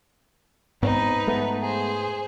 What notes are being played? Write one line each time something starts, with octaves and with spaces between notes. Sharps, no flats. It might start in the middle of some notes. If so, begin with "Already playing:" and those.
G#2 B3 C4 D#4 B4
G#3 A3 B3
G#4 C5